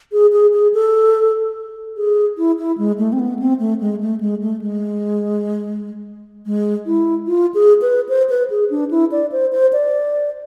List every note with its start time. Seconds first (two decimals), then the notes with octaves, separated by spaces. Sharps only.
0.12 G#4
0.33 G#4
0.53 G#4
0.74 A4
1.97 G#4
2.38 E4
2.58 E4
2.78 G#3
2.98 A3
3.13 C4
3.19 B3
3.39 C4
3.59 A3
3.81 G#3
4.01 A3
4.21 G#3
4.42 A3
4.62 G#3
6.46 G#3
6.86 E4
7.27 F4
7.54 G#4
7.82 B4
8.09 C5
8.30 B4
8.50 G#4
8.70 D4
8.91 E4
9.12 D5
9.32 C5
9.52 C5
9.73 D5